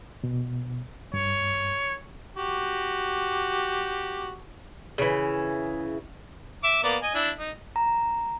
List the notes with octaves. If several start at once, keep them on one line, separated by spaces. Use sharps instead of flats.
B2
G2 C#5
F#4 G4
C#3 E3
E5 D6
A#3 B3 D5
D#5 G#5
D4 E4
D#4
A#5